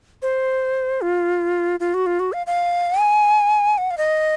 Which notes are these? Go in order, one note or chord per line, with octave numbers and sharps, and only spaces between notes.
C5
F4
F4
F#4
F4
F#4
F5
F5
G#5
F#5
F5
D#5